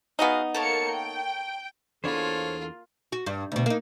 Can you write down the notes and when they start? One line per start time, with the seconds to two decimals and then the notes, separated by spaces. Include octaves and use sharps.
0.19 B3 D#4 F#4 G#4 F5
0.54 A#3 A4 A#4 C#5 A5 C#7
0.89 G5
2.04 E2 A#3 D4 F4 A4 C5 C#5 B5
3.12 F#4
3.26 G2
3.52 D2 B2
3.66 A#3 D#4